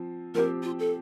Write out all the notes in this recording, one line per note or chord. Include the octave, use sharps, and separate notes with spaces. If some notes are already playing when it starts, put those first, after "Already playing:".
Already playing: F3 C4
F3 C4 G4 A#4
F4
A4